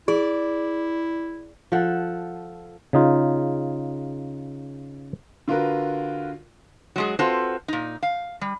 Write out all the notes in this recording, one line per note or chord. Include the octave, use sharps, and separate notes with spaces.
E4 G#4 D5
F3 A4 F#5
C#3 D#4 F4
D3 F4 F#4 A#4 B4
F#3 G#3 G#4
C4 F4 F#4 A4 B4 C5
A#2 D#4
F5
G3